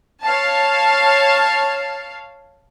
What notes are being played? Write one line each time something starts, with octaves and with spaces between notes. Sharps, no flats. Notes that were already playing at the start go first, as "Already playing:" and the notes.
C#5 F5 A5